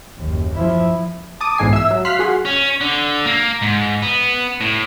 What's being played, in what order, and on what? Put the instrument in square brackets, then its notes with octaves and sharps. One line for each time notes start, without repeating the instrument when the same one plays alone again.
[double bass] F#1 D#2
F3 E4
[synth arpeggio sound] A5 D6 D#6
B1 G#2 E3 G#3 G#5 C7
E5 E6
F#3
F5 C6 F6 F#6 B6 C7
F#4 G#4 F#5 C6
[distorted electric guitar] C#4
D3
A#3
G#2
B3
A2